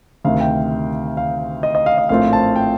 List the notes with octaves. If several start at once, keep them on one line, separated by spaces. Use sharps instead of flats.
D2 C3 D#3 F5
G5
F5
D#5
D#5
F5
D#5
A#1 A2 A3 C4 F4 F5
A5
G5